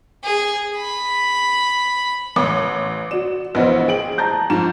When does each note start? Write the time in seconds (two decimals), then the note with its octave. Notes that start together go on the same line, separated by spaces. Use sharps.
0.24 G#4
0.78 B5
2.36 A1 D6
3.11 F#4 D5 E7
3.55 A#1 E3 B3 C5 D#5
3.88 G#4 G5 D7 F#7
4.18 A5 A#5 G6
4.50 G#2 F3 E7